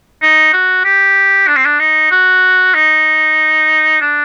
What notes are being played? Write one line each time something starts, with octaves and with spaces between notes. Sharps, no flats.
D#4
F#4
G4
D4
C4
D4
D#4
F#4
D#4
D4